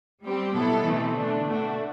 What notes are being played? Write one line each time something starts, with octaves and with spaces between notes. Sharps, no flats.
G3 C4 G4
B2 F#3 B3 E4 A4
E3 A3 C4
D3 A3 D4
B2 A3 D4 F#4